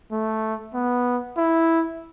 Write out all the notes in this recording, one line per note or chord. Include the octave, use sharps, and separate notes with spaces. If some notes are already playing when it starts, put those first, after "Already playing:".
A3
B3
E4